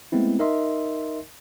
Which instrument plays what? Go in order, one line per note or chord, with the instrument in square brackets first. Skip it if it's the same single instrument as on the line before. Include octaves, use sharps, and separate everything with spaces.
[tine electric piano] G#3 A3 B3 C4 E4
D#4 A#4 D#5 E5 C6